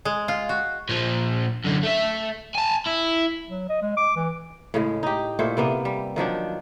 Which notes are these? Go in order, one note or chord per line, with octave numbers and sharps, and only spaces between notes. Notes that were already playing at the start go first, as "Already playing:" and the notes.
G#3
F4
F#4
A#2 F3
F#2 D3
A3 E5
G#5 A5
E4
F#3
D#5
G#3
D6
E3
A2 C#3 G#3
D#4 G4
A#2 A3 E4 C5
C3 A#3 B3
G3
D#3 F3 F#3 D4